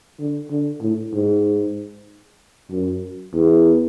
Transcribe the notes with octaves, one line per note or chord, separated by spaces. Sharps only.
D3
D3
A2
G#2
F#2
E2